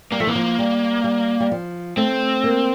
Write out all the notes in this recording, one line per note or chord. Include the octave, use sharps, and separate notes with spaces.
G3 A#3
F3 A3
E3 A#3
F3
G3
G3
G3
F3
A3 C4
A#3